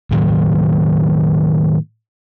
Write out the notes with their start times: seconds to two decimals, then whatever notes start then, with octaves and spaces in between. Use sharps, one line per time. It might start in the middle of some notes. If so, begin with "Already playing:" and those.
0.11 A2 D#3 F#3